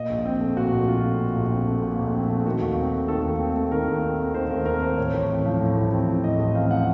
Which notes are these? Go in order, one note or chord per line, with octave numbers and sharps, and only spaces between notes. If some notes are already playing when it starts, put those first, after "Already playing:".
Already playing: A#2 D#5
A#1
C4
A3
A#2 F#4
A#1
C4 F4
A3
A#2
A#1
C4
A3
A#2
A#1
C4
A3
D#3 F#4
D#2
C4
A3
D#3 A4
D#2
C4
A3
D#3 A#4
D#2
C4
A3
D#3 C5
D#2 A#4
C4 A#4
A3 C5
A2 C#5
A1
C4
F3
A2
A1
C4
F3
A2 D#5
A1 D#5
C4 F5
F3 F#5